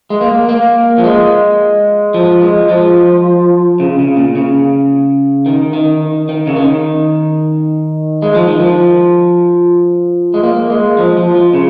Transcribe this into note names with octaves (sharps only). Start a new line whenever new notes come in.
G#3
A#3
A#3
F3
G#3
F3
G#3
F3
C#3
C#3
A#2
C#3
D#3
D#3
D#3
C#3
D#3
G#3
F3
D#3
F3
G#3
A#3
G#3
F3
F3
F3
C#3